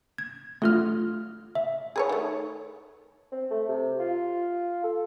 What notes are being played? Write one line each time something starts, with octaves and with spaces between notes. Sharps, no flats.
G#6
D3 A3 F4 F6
E5
G#4 B4 C#5
D#3 A3
C4
A3
C3
F4
A4